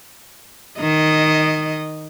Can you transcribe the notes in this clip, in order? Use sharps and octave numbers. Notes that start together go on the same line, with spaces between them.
D#3 D#5